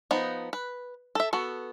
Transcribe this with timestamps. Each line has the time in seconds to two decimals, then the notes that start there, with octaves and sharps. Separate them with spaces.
0.11 F3 B3 D#4
0.53 B4
1.15 A4 E5
1.33 B3 F#4 A4